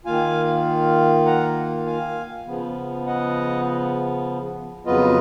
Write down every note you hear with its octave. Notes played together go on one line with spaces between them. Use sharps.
D#3 A#3 F4 F5 G#5
F#5 A#5
F5 G#5
C#3 F3 B3
D#5 F#5
F2 C#3 F#3 B3 F4 B4 D#5